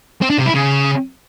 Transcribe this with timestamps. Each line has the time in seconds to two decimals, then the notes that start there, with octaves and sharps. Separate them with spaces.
0.22 C4
0.30 D4
0.38 C3
0.46 E4
0.54 C#3